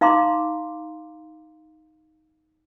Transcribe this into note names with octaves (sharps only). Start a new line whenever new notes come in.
D#4 F5 A#5 C6 D6